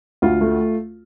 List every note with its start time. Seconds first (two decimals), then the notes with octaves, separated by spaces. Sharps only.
0.22 D2 F4
0.41 A3